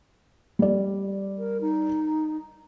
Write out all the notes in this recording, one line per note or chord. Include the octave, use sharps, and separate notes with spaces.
G3 D5
A#4
D#4